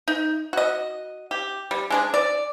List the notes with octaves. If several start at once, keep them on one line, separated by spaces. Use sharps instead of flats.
D#4
F#4 D#5
G4
G3
G#3 D4 G#4
D5